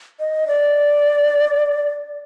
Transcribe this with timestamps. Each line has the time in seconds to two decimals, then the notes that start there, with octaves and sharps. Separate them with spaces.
0.20 D#5
0.47 D5